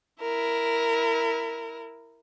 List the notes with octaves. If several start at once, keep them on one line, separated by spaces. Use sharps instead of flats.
E4 A#4